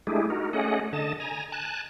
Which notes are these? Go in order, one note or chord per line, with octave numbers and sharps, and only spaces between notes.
G#3 A3 D4 E4 G4 G#4
D#4 F#4 A#4
A3 C#4 G#4 D#5 F#5
D3 D#5 A5
G#5 A#5
G#5 A5 F#6